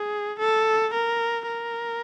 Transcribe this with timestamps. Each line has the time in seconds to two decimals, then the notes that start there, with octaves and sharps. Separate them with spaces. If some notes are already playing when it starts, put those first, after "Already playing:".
Already playing: G#4
0.39 A4
0.94 A#4
1.47 A#4